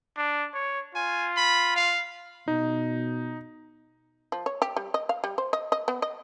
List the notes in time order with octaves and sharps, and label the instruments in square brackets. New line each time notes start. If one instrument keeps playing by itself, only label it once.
[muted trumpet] D4
C#5
[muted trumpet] F4 [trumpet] G#5
[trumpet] B5
F5
[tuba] B2 [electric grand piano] D#4
[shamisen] F3
C#5
G4
G3
D#5
F5
G3
C5
D#5
D#5
B3
D#5